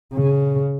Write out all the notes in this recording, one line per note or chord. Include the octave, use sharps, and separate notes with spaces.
C#3